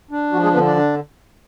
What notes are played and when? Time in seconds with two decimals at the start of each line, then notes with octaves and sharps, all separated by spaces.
0.11 D4
0.32 F3 F#4
0.43 G#3 G#4
0.54 D3 B3 B4
0.65 D4 D5
0.76 D4